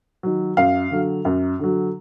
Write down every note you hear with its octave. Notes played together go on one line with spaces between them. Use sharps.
D#3 F#3
F#2 F5
D3 F#3
F#2
D3 F#3